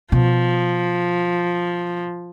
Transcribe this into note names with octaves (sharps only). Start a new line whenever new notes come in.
B2 F3